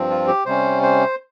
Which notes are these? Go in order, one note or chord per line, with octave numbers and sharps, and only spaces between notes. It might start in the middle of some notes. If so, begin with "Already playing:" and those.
Already playing: G2 F3 C4
F4
G4
C3 G3 C#4 C5
C5